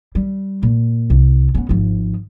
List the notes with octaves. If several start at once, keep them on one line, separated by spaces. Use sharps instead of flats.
G3
A#2
C2
B3 C#4
G#1 F3